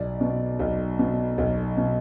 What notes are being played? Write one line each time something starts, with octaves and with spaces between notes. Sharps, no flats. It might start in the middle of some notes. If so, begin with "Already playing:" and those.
Already playing: B1 D5
B2
B1
B2
B1
B2